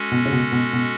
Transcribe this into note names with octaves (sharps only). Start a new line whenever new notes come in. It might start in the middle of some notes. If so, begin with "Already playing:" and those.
Already playing: G#3 C#4 F#4 A4
B2
C#3
B2
B2
B2